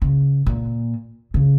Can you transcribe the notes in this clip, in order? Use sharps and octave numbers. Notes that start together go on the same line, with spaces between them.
C#3
A#2
C#3